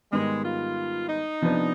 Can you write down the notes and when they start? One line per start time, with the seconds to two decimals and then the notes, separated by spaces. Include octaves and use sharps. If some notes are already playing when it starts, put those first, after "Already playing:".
0.12 G#2 D#3 G3 G#3 B3
0.45 F4
1.09 D#4
1.41 C3 F3 B3 D4